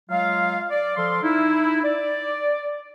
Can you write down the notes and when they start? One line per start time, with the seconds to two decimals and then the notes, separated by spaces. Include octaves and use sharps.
0.10 F#3 G#3 F4 F5
0.70 D5
0.97 F3 A4 F5 C6
1.23 D#4 E4
1.83 D5